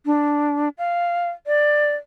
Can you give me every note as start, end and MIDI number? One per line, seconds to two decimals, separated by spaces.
0.06 0.69 62
0.78 1.29 77
1.47 1.94 74